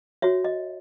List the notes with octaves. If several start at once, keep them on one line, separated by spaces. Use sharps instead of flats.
F#4 C#5 E5
D#5